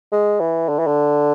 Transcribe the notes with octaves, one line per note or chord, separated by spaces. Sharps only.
G#3
E3
D3
E3
D3